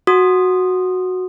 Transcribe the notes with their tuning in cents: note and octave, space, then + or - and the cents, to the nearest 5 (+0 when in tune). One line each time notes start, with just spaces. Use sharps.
F#4 -5 D#6 -15